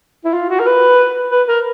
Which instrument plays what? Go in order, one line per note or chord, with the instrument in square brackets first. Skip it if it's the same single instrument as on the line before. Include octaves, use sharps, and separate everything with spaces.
[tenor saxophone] E4
F4
F#4
A#4
B4
B4
A#4